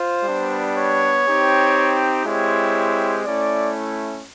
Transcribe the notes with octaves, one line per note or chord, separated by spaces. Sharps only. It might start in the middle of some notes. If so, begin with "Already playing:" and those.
Already playing: F4 C5
G3 B3 D4
C#5
C4 D#4 G4
G#3 C4 E4 G4 C#5
A3 C#4 E4 D5